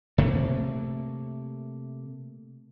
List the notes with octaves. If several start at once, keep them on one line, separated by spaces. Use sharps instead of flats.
C3 A3 A#3